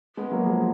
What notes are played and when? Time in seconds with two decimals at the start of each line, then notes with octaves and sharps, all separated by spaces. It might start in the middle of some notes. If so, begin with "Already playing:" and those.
0.17 G#3 B3
0.31 F#3 A#3
0.46 F3 G#3